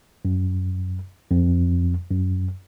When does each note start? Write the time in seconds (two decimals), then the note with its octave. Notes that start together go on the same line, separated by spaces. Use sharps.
0.25 F#2
1.31 F2
2.11 F#2